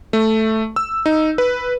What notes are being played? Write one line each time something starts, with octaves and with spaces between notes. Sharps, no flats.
A3
E6
D#4
B4